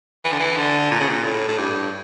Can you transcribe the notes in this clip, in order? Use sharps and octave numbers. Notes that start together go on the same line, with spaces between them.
E3
D3
E3
D3
A#2
C#3
A#2
A2
A2
G2